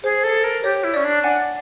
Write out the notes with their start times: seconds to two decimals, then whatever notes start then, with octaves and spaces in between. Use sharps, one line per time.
0.03 G#4 C5
0.24 A4
0.44 A#4
0.63 G4 C#5
0.84 E4
0.94 C#4 D5
1.04 D4
1.23 D4 F#5 G#5